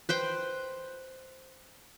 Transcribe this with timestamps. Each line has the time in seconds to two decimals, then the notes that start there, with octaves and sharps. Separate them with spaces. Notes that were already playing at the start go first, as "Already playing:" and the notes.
0.09 B4 C5 G5